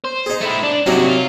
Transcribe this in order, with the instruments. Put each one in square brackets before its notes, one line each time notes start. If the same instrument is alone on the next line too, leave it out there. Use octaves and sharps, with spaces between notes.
[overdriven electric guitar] C5
[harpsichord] D#4 G#4
[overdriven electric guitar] A3 E4
D4
[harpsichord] C3 F#3 D#4 [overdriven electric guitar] A#3 F#4
[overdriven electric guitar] F4